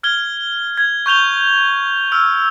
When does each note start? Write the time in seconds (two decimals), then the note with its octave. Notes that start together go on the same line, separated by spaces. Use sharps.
0.03 F6 G#6 G7
0.77 G#6
1.06 C#6 G6 F7 G7
2.12 E6 F6